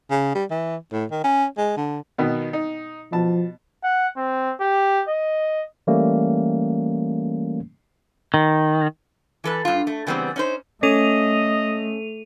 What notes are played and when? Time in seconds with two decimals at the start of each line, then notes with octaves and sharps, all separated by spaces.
0.10 C#3
0.35 G3
0.50 E3
0.92 A2
1.11 D#3
1.24 C#4
1.57 G#3
1.77 D3
2.18 B2 D#3 B3
2.53 D#4
3.12 B2 F3 A5
3.83 F#5
4.17 C4
4.60 G4
5.08 D#5
5.87 E3 G3 A3 A#3 C#4
8.34 D#3
9.44 E3 A4 B4
9.65 G2 F4
9.87 A3
10.07 C#3 E3 G3 B3 C4
10.36 C#4 D#4 C5
10.83 A3 C#4 A4 D#5 D#7 F7